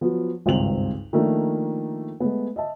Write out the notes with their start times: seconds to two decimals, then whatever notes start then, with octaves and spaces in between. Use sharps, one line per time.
0.01 F3 F#3 B3
0.46 G#1 C#2 G2 C4 F7 F#7
1.13 D#3 F3 A3 A#3 D4
2.20 G#3 A3 B3
2.56 D#5 E5 A5